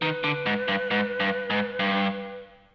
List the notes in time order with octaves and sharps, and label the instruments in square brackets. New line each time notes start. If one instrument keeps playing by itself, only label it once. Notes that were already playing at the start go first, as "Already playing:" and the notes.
[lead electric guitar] D#3 [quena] B4
[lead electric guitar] D3
G#2
G2
G#2
G2
G#2
G2